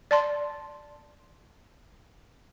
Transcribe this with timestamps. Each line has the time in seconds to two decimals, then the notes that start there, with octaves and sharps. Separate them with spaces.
0.11 D5 A5 C6